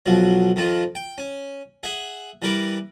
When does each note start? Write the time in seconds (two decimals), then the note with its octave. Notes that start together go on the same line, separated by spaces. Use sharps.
0.06 B1 B2 F3 F#3
0.56 F2 D#3 F3 F4
0.95 G5
1.18 C#4
1.83 G#4 E5 F#5
2.42 E3 G3 A#4 B4 D6